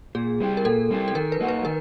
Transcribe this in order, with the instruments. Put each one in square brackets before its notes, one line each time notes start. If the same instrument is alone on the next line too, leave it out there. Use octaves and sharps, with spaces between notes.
[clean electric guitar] A#2 [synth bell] G#4
[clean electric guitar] G3 C4 E4 G4
[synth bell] A#4
[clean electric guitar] A#2 [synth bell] A4
[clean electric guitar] G3 C4 E4 G4
[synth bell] A4
[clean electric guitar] D#3 [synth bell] A#4
[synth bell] B4
[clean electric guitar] F#3 A#3 D#4 F#4
[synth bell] B4
[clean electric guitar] D#3 [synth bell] A#4